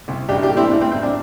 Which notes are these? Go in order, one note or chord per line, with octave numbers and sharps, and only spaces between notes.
C2
A1 D4 G4
D4 G4
A3
C4 E4
A1 D4
C4
A1 C4
D4